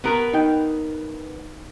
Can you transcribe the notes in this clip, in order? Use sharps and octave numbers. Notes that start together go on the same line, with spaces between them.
B3 A#4 B4
D#4 G5